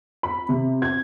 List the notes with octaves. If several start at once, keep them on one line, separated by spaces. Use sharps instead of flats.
B5
C3
G#6